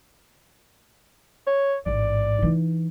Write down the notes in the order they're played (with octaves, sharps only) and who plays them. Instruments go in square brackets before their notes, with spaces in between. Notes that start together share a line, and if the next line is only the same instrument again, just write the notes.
[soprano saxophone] C#5
[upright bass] A1 G#2 [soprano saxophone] D5
[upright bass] E3 D#4